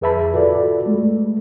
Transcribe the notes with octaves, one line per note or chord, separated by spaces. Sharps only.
F2 G#4 B4 E5 A5 B5
F4 F#4 A4 D5
G#3 A3